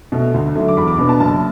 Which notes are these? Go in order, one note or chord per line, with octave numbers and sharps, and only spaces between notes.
B2 A3
D2
D3 F#3 A3 D4
D6
E2 B5
D6
B2 B3 D4 B5
A5
F#1 A5